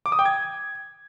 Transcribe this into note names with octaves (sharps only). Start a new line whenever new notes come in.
D6
D#6
G5
G#6